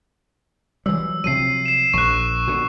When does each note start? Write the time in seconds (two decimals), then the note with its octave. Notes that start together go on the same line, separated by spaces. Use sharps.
0.86 E3 F#3 G3 E6
1.24 C3 F3 F#3 C7 D#7
1.66 C7 E7
1.94 A#1 C#6 F#6
2.48 B2 D3